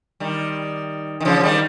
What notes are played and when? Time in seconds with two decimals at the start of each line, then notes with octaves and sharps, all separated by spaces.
0.20 D#3 G3
1.21 D#3
1.25 C#3 F3
1.43 D#3 G3